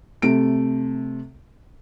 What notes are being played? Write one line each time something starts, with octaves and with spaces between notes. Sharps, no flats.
C3 A3 D7